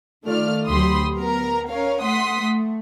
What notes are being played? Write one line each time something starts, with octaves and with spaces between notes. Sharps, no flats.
D#3 A3 F4 D5 F6
D2 F#3 G4 B5 C6 D#6
B3 A#4 A#5
C#4 A#4 C#5 F5
A3 F#5 C6 D#6 B6
A3